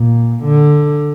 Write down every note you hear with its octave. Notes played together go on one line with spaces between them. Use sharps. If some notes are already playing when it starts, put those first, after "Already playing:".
Already playing: A#2
D3